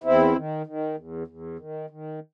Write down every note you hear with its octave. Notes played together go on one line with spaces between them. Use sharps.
E2 C4 E4
D#3
D#3
E2
E2
D#3
D#3